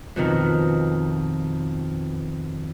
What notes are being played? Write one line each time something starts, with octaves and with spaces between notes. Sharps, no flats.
F2 B2 D#3